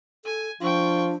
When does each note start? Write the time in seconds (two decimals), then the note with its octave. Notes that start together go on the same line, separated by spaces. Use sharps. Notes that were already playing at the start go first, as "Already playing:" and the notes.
0.25 A4 G#5
0.61 F3 D4 F4 G5 C#6